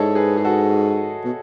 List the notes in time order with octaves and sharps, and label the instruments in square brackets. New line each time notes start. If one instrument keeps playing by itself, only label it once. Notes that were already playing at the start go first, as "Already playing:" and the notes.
Already playing: [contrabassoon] G#2 [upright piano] E4 G#4 A4 C#5 D#5
[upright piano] G#4 B4
G#4
F#4 A4
[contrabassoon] B2